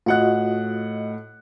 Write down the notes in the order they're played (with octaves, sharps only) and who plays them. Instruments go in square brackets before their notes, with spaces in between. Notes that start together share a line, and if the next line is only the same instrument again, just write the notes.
[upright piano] A2 F#5 F#6 [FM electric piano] F4 F#4 D#5